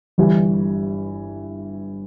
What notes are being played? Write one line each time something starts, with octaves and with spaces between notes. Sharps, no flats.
G1 G2 E3 G3